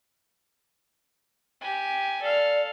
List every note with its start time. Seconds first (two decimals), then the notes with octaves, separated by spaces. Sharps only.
1.61 G4 G#5
2.22 A4 D5 F5